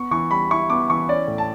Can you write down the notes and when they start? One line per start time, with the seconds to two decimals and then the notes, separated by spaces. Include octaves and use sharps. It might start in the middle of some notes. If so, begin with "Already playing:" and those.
Already playing: B3 C#6
0.11 E3 C#6
0.31 G3 B5
0.50 E4 C#6
0.70 B3 D6
0.89 E3 C#6
1.09 C#4 D5
1.27 A2
1.38 A5